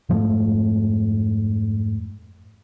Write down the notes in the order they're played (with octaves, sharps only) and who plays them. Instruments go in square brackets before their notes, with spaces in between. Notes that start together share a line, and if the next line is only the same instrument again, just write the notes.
[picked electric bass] F2 G#2 F3 A3